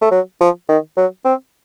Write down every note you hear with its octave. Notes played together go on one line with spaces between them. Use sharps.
A3
F#3
F3
D#3
F#3
C4